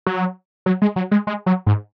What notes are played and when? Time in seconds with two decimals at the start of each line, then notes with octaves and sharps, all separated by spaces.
0.06 F#3
0.66 F#3
0.82 G#3
0.96 F#3
1.11 G#3
1.27 G#3
1.46 F#3
1.66 G#2